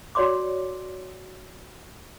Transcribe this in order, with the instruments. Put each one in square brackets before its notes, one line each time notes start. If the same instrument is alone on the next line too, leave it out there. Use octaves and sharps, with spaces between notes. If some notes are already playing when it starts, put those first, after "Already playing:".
[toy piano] F#4 C#5 D5 C6 D6